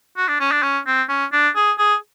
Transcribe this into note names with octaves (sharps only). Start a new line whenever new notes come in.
F#4
D4
C#4
D4
C#4
C4
C#4
D4
G#4
G#4